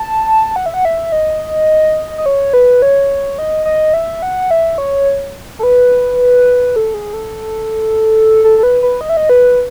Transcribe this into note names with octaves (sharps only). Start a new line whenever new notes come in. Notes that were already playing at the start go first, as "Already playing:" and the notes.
Already playing: A5
F#5
E5
F#5
E5
D#5
D#5
C#5
B4
C#5
D#5
D#5
E5
F#5
E5
C#5
A4
B4
A4
G#4
A4
A4
A4
B4
B4
D#5
E5
D#5
B4